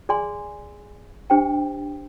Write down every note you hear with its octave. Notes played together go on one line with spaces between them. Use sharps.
G#4 D5 G#5 C6
D4 G4 C5 G5